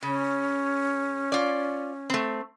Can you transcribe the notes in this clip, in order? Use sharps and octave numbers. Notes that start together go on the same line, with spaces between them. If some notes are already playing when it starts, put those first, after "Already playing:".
C#3 C#4
F4 D5
A3 C4